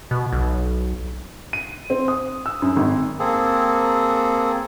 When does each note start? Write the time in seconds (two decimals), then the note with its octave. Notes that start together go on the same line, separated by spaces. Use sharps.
0.11 B2
0.32 B1
1.53 D#7
1.90 C4
2.08 D#6
2.46 E6
2.62 F#2
2.76 G#1
3.19 A#3 C4 G#4 A4